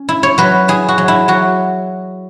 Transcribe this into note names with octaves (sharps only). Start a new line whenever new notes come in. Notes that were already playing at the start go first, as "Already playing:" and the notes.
Already playing: C#4
E4
C#5
F#3 B4
E4 G#4
F#4
F#3
E4
F#3 F#4